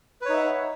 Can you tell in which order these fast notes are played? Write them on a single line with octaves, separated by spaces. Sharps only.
B4 C#5 D#4 E5 F#5